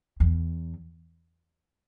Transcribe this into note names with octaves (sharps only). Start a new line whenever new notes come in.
E2